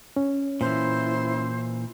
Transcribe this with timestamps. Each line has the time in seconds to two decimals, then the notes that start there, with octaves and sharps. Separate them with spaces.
0.16 C#4
0.61 A#2 E3 E4 C5